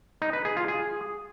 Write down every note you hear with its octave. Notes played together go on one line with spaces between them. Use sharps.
D#4
B4
G#4
F4
G#4